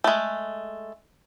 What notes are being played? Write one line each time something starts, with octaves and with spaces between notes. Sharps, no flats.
G#3 A3